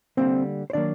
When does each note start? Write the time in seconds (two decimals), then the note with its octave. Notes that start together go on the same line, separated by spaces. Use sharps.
0.17 D3 G3 A#3 C4 D4 C5
0.70 C5
0.73 D#3 F#3 A#3 D4 D5